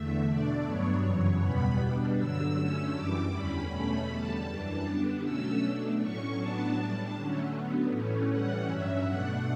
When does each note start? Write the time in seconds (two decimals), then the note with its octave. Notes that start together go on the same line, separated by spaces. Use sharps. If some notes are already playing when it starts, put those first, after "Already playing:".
Already playing: E2 D3 A3 E5
0.26 B2 A3 D4 D5
0.65 G2 F#3 B3 D4 C#5
1.03 F#2 C#3 E3
1.41 E2 B2 G3 B3 B5
1.79 B2 G3 D4
2.18 G2 D3 F#3 E6
2.55 D3 A3 C#4 E6
2.94 F#2 E3 G3 D6
3.32 E2 D3 G3 C#4 B5
3.70 E2 B2 A3 C#4
4.09 E2 D3 G3 A5
4.47 F#2 E3 G3 D4 A5
4.85 D3 G3 B3 D4
5.23 B2 F#3 A3 C#4 E6
5.61 B2 A3 D4
6.00 A2 F#3 C#4 C#6
6.37 A2 F#3 B3 D4 A5
6.76 A2 G3 D4
7.14 D3 F#3 A3 C#4
7.53 D3 F#3 B3
7.90 A2 E3 A3 C#4
8.29 A2 E3 G3 C#4 F#5
8.67 G2 F#3 C#4 E5
9.05 B2 A3 D4 F#5